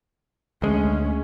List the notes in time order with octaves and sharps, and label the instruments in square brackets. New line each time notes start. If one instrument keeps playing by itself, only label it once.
[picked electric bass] D2 G#3 [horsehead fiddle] C#4